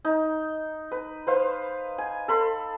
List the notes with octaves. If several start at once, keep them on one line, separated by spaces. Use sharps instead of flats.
D#4
B4
B4 C5 F5
G#5
A4 B5 C6